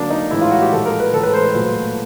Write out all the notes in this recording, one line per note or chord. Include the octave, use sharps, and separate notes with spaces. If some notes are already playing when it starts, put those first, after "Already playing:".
Already playing: D3 F#3 A#3 D4
D#4
A2 E3 G#3 E4
F4
F#4
G4
A#2 F3 G#3 A4
A#4
B4
A2 E3 G#3 A4
B4
C5
B4
A#2 F#3 A3